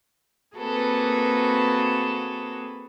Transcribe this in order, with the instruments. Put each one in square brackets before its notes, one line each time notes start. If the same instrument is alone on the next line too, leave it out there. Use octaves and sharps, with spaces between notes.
[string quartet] A#3 C4 F#4 G#4 A4 B4